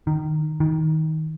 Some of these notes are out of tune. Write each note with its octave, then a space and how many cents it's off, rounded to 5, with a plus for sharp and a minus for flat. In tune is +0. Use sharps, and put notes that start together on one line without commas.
D#3 -15
D#3 +20